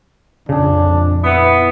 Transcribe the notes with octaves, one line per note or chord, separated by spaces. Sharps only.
A#1 F2 C#3 D4 G#4
B3 E4